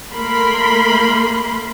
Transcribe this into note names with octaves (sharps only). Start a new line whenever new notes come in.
A3 A#3 A#4 B5 C6